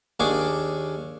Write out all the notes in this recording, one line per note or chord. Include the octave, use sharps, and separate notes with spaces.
D#2 D4 G#4 C#6 D6